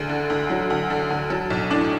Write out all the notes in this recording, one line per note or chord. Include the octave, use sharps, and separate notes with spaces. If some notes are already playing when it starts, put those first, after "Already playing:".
Already playing: D2 G#4
D3
D2
F#3
D2
D3
D2
F#3 A4
B1
A2 D4